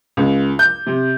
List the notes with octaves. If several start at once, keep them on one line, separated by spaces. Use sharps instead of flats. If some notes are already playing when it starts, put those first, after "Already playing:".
C#2
G6
C3